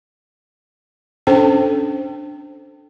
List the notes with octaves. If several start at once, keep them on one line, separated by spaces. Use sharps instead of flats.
C#4 D4 A4 C5 G5